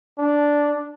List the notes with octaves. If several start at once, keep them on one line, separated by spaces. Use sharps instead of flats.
D4